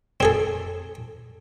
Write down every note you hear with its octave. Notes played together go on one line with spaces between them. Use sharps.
C4 G#4 A4